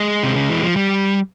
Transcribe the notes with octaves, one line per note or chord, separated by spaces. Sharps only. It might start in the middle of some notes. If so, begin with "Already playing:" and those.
Already playing: G#3
C3
C#3
E3
F3
G3